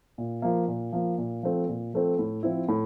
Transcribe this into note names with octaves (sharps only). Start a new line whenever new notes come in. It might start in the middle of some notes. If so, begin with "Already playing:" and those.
A#2
F3 A#3
A#2
F3 A#3
A#2
F3 A3 C4
A#2
F3 A3 C4
A2
F3 C4 E4
A2